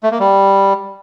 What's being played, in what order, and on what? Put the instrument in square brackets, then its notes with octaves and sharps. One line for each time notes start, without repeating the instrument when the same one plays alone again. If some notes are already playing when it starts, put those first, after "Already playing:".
[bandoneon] A3
A#3
G3